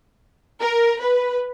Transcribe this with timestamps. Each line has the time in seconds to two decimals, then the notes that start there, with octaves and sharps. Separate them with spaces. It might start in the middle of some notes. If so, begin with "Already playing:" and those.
0.61 A#4
1.01 B4